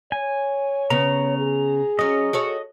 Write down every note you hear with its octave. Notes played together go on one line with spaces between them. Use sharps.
C#5 G#5
C#3 B3 A#5
G#4
F#3 C#4 D#5
F#4 A4 C#5